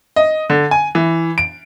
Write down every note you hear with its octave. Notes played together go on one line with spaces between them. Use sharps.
D#5
D3
G#5
E3
D7